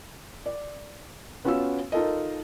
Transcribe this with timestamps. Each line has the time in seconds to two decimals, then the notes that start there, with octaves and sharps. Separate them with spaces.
0.46 D5
1.45 B3 C#4 F4 F#4 F5 E6
1.92 D#4 F4 A4 A#4 D#5